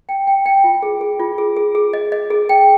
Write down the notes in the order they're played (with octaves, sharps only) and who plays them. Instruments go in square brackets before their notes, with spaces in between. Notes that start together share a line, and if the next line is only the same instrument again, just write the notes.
[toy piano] G5
G5
G5
F4
G#4
G#4
F4
G#4
G#4
G#4
D#5
D#5
G#4
G5